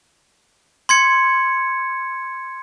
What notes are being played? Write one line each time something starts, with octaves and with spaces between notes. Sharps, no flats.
C6 G#6 C#7